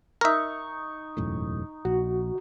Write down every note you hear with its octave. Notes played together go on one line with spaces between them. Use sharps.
D#4 A#4 E5 C#6
E1 F#2 A2
A#1 F#4